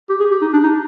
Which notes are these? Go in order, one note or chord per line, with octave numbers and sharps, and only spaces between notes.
G4
G#4
G4
D#4
D4
D#4